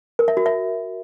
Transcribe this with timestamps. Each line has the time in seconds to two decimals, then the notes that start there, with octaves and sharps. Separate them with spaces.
0.19 A#4
0.28 E5
0.37 F#4
0.46 E5